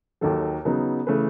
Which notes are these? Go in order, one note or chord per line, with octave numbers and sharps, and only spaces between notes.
D#2 D#3 F#3 A4
C#3 F#3 B3 D#4
C#3 E3 A3 B4